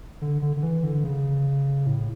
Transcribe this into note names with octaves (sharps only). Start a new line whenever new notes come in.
D3
D3
D3
E3
D3
C#3
A2